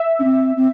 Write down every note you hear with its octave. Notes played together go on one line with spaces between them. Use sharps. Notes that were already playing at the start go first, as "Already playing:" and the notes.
Already playing: E5
C#4
C4
C4